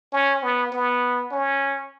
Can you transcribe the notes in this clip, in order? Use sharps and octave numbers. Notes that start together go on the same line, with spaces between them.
C#4
B3
B3
C#4